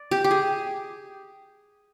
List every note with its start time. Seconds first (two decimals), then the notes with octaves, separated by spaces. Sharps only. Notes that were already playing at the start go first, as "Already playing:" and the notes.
Already playing: D5
0.11 G4
0.24 G4
0.31 G#4